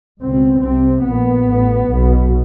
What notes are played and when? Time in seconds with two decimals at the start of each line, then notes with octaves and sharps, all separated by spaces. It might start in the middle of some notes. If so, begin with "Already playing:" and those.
0.22 C#2 B2 C4
0.64 C2 C3 C4
1.06 A#1 A#2 B3
1.47 A1 A2
1.89 B1 B2